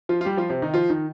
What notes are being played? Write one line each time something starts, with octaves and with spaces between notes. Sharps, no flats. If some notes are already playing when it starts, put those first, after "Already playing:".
F3 F4
F4
G3 G4
F3 F4
C3 C4
D#3 D#4
F3 F4
D#3 D#4